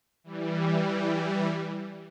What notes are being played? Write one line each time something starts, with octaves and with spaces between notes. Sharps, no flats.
E3 G3